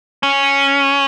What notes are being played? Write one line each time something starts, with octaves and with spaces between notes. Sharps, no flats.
C#4